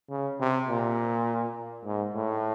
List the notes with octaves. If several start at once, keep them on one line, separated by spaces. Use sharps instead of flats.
C#3
C3
A#2
G#2
A2